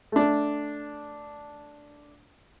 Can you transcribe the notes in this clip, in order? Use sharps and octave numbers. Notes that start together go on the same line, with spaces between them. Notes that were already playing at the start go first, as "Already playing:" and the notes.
A3 D4